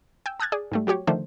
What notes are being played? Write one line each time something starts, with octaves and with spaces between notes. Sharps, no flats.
G5 G#5 E6
A5 D#6 F6 F#6 G#6 A6
G#4 D5 G#5
G#2 G3 A3
F#3 F#4 G4 C#5
D3 D#3 F3 A3 D4 C5